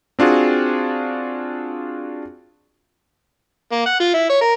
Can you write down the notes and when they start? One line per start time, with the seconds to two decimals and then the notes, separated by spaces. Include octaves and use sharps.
0.19 C4 D4 F4 F#4 G#4
3.71 A#3
3.86 F#5
4.00 F4
4.14 E4
4.30 C#5
4.41 A#4